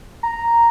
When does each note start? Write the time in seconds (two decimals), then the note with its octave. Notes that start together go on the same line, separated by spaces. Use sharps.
0.23 A#5